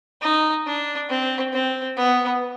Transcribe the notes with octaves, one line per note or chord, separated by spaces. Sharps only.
D#4
D4
C4
C4
B3